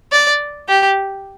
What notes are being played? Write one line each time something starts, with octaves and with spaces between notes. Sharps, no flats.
D5
G4